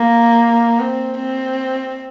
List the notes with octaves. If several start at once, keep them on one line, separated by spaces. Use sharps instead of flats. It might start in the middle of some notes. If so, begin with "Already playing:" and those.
Already playing: A#3
C4
C4